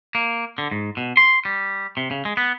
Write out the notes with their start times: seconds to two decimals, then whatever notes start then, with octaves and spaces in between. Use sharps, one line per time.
0.15 A#3
0.58 D3
0.71 G#2
0.97 B2
1.17 C6
1.45 G3
1.97 C3
2.11 C#3
2.25 G#3
2.37 B3